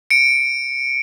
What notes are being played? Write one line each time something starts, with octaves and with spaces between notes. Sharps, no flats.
C#7 D7